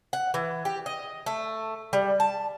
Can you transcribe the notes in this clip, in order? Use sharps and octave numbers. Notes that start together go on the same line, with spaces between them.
F#5
E3
G4
D#5
A3
G3
A5